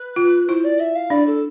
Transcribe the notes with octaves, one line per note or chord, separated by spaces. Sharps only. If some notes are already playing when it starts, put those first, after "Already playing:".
Already playing: B4
F4
E4 C5
D5
E5
F5
D4 D5
A4